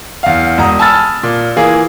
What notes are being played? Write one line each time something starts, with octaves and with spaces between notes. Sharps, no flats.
E2 F5
E1 A#5 D#6
G#5 A5 B5 E6 F6 A6
A#2
E3 A#3 F4 G#4